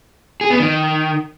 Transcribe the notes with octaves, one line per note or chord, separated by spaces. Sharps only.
G#4
B3
D#3